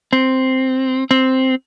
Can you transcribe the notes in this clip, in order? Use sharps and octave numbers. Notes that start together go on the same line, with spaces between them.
C4
C4